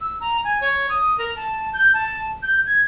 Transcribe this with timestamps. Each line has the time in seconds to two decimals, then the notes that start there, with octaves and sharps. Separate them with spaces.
0.01 E6
0.21 A#5
0.44 G#5
0.61 C#5
0.89 D#6
1.18 A#4
1.36 A5
1.73 G6
1.94 A5
2.43 G6
2.67 G#6